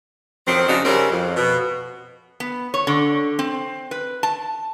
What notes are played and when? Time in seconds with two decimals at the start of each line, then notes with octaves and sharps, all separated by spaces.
0.47 F2 D#3 F3 F#3 C4
0.67 F2 C#3 D4 D#4 F4 F#4
0.85 C#3 F#3 G3 C4 C#4 A#4
1.11 F2
1.36 B2
2.40 B3
2.74 C#5
2.87 D3
3.39 C4
3.91 B4
4.23 A5